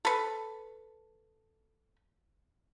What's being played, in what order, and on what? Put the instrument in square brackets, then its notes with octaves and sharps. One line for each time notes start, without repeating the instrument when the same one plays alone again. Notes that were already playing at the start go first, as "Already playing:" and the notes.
[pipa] A4 B4